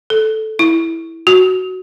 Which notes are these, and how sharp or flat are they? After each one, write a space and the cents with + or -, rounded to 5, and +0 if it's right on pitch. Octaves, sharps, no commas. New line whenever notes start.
A4 -10
E4 -5
F#4 +5